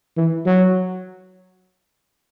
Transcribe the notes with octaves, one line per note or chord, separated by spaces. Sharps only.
E3
F#3